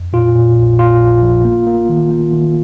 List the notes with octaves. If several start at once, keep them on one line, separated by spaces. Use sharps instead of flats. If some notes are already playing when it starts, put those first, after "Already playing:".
Already playing: F2
A#2 F4
A#2
A#1
A#2 F4
A#1
A#1
A#3
A#3
D#3
A#3
D#3